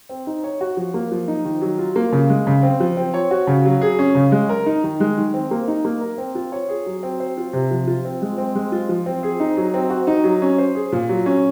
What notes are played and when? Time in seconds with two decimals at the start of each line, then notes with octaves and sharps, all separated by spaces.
0.09 C4
0.27 D#4
0.43 C#5
0.61 F#4
0.77 F3
0.94 A#3
1.11 F3
1.28 D#4
1.45 D#3
1.61 F#3
1.79 F4
1.96 A#3
2.12 C#3
2.29 G#3
2.47 C#3
2.63 C4
2.80 F3
2.97 C4
3.14 C#5
3.31 F#4
3.47 C#3
3.65 F#3
3.81 G#4
3.99 C#4
4.15 C#3
4.32 G#3
4.49 A#4
4.66 D#4
4.84 D#3
5.00 G#3
5.18 D#3
5.34 C4
5.51 A#3
5.68 D#4
5.85 A#3
6.01 A#4
6.18 C4
6.35 F4
6.52 C#5
6.69 G#4
6.86 F#3
7.03 C4
7.20 C5
7.37 F4
7.53 C3
7.71 F3
7.87 F4
8.05 C4
8.22 G#3
8.38 C4
8.55 G#3
8.72 F4
8.89 F3
9.06 C4
9.23 G#4
9.40 D#4
9.57 F#3
9.74 C4
9.90 F#4
10.07 D#4
10.24 F#3
10.42 C#4
10.58 C5
10.75 G#4
10.92 A#2
11.09 F#3
11.26 C#4